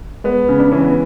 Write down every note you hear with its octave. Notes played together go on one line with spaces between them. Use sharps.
G#3 B3
C#3
D4
E3 C#4
B3